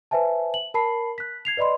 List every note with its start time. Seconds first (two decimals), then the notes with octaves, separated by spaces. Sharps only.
0.11 B4 C5 E5 G#5 A5
0.54 F#7
0.74 A#4 A5 B5 C7
1.18 F#6 B6
1.45 G#6 C7 F7
1.57 B4 D5 D#5 B5 C6